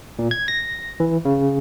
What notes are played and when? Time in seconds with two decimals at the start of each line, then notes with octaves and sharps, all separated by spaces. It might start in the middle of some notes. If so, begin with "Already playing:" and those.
0.19 A#2
0.31 G#6
0.48 A#6
1.00 E3
1.25 C#3